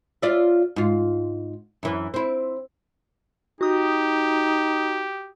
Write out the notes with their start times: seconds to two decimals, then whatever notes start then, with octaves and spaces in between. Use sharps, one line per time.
0.22 F4 D5 E5
0.76 G#2 F4
1.83 F#2 E3
2.14 C4 E4
3.61 D#4 F#4 G4 D#6